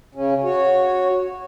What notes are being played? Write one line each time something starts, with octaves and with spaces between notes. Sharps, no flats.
C#3 C#4
F#4 C#5